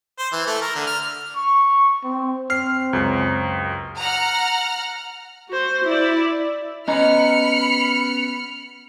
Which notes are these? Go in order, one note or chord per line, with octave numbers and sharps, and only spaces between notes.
C5
E3
A3
A#4
D3
F6
C#6
C4
C4 F6 C7
C#2 F#2
F#5 A#5 F6
F#4 C5
E4 D5
B3 C#4 D#5 A#5 B5 F6 C#7